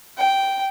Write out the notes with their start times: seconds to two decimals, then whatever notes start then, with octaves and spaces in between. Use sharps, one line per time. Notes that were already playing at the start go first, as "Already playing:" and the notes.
0.18 G5